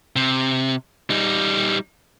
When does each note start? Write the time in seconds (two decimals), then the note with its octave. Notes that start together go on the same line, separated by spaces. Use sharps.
0.16 C3
1.10 G3 D#4